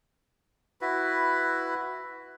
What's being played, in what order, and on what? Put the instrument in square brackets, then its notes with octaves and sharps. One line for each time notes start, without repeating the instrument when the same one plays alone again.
[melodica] E4 F#4 B4